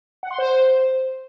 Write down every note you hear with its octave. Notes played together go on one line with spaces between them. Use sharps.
F#5
C6
C5